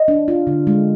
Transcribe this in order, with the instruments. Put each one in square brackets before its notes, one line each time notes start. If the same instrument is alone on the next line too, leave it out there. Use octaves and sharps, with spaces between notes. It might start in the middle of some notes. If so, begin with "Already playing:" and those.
Already playing: [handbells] D#5
[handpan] D4
F4
D3
G#3